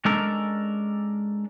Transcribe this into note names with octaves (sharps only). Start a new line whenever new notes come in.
G#3 C#4 D4 A4 A#4